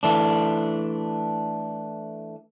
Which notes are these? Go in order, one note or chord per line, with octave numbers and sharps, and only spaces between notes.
E3 A3 D4